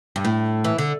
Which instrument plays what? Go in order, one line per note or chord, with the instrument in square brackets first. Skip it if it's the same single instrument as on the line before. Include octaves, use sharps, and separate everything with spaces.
[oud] G2
A2
E3
D3